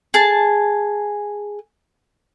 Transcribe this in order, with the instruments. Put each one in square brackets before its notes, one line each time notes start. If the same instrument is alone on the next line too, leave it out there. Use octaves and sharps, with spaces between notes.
[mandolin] G#4 A5